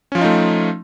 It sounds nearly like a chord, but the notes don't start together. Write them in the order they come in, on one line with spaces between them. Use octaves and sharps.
C#4 F3 F4 D#4 A3